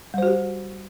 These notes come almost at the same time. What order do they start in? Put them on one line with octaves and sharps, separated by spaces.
G3 C5 F#4 G4